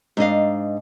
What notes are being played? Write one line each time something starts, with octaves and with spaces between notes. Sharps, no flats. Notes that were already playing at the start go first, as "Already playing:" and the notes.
G#2 D4 D#5 F5